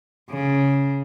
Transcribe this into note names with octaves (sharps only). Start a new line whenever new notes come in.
C#3